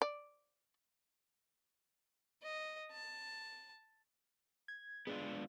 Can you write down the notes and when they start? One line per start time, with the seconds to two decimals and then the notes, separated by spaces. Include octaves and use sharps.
0.02 D5
2.43 D#5
2.92 A5
4.68 G#6
5.07 G#3 B3 D4 F4